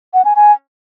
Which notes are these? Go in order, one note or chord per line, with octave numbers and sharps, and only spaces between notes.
F#5
G#5
G#5